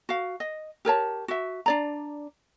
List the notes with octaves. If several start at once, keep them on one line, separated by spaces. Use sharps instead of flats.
F#4 F5
D#5
G4 A#4 C#5 A5
F#4 E5
D4 D5 A#5